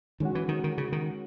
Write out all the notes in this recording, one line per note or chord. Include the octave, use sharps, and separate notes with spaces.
D#3 G#3 C#4 F#4
E3
D#3
D#3
C#3
D#3